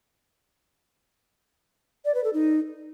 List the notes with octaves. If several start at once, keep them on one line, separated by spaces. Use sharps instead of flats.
D5
B4
A4
D#4